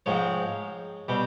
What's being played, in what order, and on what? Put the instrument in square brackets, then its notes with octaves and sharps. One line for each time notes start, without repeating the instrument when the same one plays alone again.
[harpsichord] G#2 F3 G#3 C4 C#5
B2 G3 C4